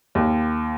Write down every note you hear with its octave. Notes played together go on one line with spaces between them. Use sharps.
D#2